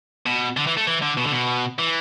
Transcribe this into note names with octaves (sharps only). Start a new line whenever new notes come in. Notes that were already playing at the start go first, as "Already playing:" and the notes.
B2
D3
E3
A3
E3
D3
B2
D3
B2
E3